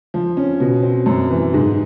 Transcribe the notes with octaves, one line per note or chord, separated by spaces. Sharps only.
F3
C#4
B2
C4
F#2
E3
G#2